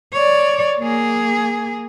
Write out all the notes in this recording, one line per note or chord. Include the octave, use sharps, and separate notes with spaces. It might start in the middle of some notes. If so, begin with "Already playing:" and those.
C#5 D5
A#3 G#4